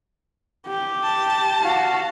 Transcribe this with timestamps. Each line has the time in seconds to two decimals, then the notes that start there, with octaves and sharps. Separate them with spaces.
0.67 G4
1.04 A5
1.62 F#4 F5